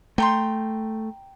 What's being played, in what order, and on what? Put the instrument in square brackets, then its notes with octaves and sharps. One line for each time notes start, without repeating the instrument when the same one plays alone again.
[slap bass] A3 [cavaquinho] G5 A#5 C6